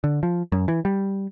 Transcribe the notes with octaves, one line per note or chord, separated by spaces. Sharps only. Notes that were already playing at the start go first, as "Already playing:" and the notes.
D3
F3
F#2
E3
G3